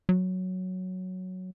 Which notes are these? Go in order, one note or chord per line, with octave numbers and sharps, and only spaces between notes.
F#3